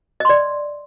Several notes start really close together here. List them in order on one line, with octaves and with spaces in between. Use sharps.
D#5 C6 D5